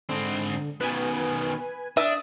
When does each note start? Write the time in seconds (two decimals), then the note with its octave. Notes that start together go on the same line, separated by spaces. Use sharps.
0.09 G#2 D3 C4
0.81 B2 D#3 B4 G#5
1.97 D4 E5 D#6